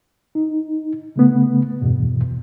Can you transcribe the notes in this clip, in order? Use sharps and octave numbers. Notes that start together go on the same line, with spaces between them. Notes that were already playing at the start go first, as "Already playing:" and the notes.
D#4
C#3 A3 B3
E2 G2 B2